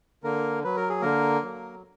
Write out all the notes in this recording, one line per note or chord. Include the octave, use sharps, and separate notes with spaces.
D3 A#3 A#4
F#3 B4
A#4
G#4
D3 A#3 A#4
F#3